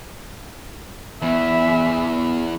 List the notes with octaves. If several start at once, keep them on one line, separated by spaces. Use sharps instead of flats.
E2 E3 B3 E5